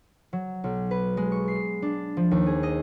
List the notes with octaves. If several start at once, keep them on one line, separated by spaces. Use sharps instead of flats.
F#3
B1
B4
G#3
C#6
C7
D4
F3
D#2
G#4
D#5